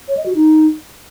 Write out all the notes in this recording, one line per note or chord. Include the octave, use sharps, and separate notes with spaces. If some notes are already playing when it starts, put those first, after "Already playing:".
C#5
D#5
F#4
D#4